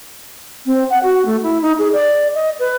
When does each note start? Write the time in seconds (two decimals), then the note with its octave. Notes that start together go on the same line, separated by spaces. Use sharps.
0.66 C4
0.90 F#5
1.03 F#4
1.26 A3
1.43 E4
1.62 D#4
1.79 G#4
1.93 D5
2.34 D#5
2.59 B4